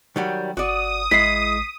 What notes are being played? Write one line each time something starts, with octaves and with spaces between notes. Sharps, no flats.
D#3 F#3 G3
G1 F#4 D5 D#6
A1 G#3 E4 B6 C7